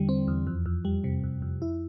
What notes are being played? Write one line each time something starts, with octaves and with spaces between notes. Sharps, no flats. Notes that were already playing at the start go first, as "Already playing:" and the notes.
Already playing: E2 D3 G3
C4
E2
F2
F2
G3
C3
F2
F2
E4